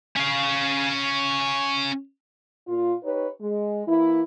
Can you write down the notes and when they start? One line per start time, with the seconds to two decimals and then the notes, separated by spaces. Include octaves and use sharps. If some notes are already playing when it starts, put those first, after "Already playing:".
0.16 C#4 F5
2.68 A#2 F4
3.04 D#4 G4 B4 C#5
3.41 G#3
3.87 E3 A#3 E4